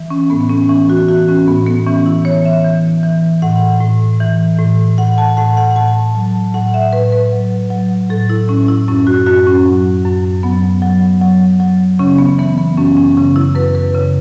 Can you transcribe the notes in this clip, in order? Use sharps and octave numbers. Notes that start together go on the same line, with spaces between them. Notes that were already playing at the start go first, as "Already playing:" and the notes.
Already playing: E3
C#4
A2 B3
B3
C#4
E3 C#4
F#4
E3 F#4
C#4
A2 B3
B3
E3 C#4
E4
E3 C#5
E5
E3
E3
A2 F#5
A2
E3
A2
A2 F#5
A5
A2 F#5
F#5
A2 A5
F#3 A5
A2 F#5
E5
A2 B4
B4
F#3
F#3
A2 A4
E4
A2 C#4
E4
F#2 C#4
F#4
F#2 F#4
C#4
F#3
F#2
F#3 B3
F#3
F#3
F#3
C#3 C#4
B3
E3 B3
B3
F#2 C#4
C#4
C#3 C#4
E4
F#2 B4
B4
C#3